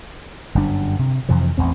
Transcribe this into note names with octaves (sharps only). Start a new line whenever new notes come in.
G1 F#2 G3 D4
C3
F2 C3 E3 F3
A1 E2 C4